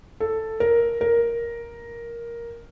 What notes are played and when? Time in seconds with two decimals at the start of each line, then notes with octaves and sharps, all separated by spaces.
0.20 A4
0.60 A#4
1.01 A#4